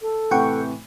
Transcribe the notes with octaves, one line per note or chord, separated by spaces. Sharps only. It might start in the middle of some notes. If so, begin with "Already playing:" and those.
A4
A2 C3 E3 F#5 G5 C#6